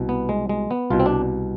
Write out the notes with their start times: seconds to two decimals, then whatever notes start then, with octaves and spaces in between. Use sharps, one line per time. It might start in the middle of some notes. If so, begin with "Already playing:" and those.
Already playing: C2 B2
0.09 B3
0.29 G#3
0.49 G#3
0.71 B3
0.90 C2 B2 F4
1.00 C4
1.06 D4